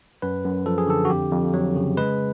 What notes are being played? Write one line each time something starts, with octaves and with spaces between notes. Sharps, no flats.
F#2 B4
F#2
F3 A4
G#4
D3 A4
F#4
F2 G4
F2
F#3
C#3
G#3 B4